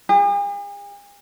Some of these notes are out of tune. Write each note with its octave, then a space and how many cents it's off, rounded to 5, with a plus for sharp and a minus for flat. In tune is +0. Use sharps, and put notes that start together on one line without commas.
G#4 -45